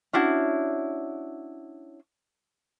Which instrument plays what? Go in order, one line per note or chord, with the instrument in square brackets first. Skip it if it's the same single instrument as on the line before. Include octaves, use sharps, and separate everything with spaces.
[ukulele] C#4 D4 E4 F#4